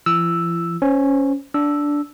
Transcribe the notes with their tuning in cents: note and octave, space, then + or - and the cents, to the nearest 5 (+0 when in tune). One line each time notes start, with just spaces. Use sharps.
F3 -45 E4 +40 E6 +0
C#4 +0 C5 -10
D4 -10 E6 +0